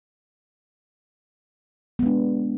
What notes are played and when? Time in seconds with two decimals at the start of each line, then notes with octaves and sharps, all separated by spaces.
1.99 B3
2.03 G#3
2.06 D4